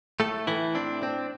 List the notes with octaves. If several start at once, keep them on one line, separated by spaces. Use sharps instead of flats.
A2 A3 A4
A2 E3 E4
C4 D4
C4